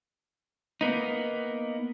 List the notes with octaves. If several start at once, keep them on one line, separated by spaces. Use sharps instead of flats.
A#3 B3 D#4